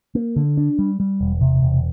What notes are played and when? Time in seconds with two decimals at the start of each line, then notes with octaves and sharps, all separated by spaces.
0.15 A#3
0.36 D3
0.57 D4
0.79 G3
1.00 G3
1.21 E1
1.41 C3
1.62 E1